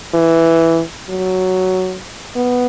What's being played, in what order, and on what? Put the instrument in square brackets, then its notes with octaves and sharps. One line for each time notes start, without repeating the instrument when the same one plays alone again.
[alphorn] E3
F#3
B3